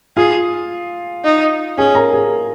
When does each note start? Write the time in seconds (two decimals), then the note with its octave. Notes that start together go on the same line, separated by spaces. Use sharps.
0.17 F4 G#4 F5
1.24 D#4
1.78 C#4 G#4 G#5
1.95 A#4 A#5
2.13 G#4 G#5